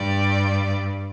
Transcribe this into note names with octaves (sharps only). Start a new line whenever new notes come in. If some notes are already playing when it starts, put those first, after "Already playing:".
Already playing: G2 G3 D5